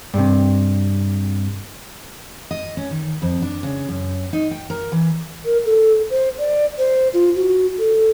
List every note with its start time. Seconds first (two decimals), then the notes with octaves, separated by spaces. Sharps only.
0.14 G2 C3
2.51 D#5
2.77 C#4
2.91 D#3
3.22 F2
3.42 D4
3.63 C#3
3.89 F#2
4.33 D#4
4.51 G5
4.70 A#4
4.92 E3
5.45 A#4
5.66 A4
6.10 C5
6.39 D5
6.78 C5
7.14 F4
7.36 F#4
7.79 A4